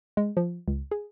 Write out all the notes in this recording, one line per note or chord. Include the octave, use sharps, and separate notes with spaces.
G#3
F3
C#2
G#4